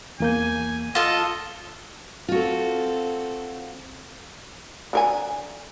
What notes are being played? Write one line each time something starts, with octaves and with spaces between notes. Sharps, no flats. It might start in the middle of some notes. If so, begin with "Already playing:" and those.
E2 A#3 G#5 G6
F4 A4 D#5
C4 F4 F#4 A4
D3 A#4 G#5